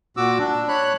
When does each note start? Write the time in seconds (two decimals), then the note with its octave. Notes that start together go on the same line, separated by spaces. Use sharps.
0.17 A#2 F#4 D6 E6
0.39 D4
0.68 C#5 B5 F#6